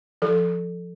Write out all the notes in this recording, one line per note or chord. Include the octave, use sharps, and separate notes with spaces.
F3 A4